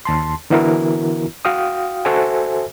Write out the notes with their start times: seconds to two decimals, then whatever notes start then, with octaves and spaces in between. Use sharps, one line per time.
0.05 D#2 A5 C6
0.50 D3 E3 B3 E4 F#4 A#4
1.45 F#4 F5 G5 D#6
2.05 F#4 A4 C5 E5 G#5